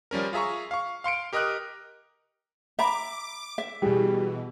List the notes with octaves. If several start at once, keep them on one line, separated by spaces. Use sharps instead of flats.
F3 G3 C#4 A#4
F4 G#4 E5 A#5 C#6
F5 C#6
F5 C6 C#7 D7
G4 A#4 D#5 D#6 F6 F#6
E5 A#5 B5 D6
E5
B2 E3 G3 G#4